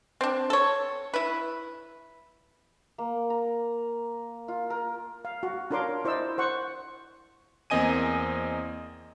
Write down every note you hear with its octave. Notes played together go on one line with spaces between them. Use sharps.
C4 D4
A4 C#5
E4 B4
A#3
A#5
F4
A#4
F5
F#4
D4 F4 A#4 C#5 C6 D6
E4 C5 D5 D#5 E6
C5 F#5 C#6
E2 A#3 C4 D#5 G#5 D#7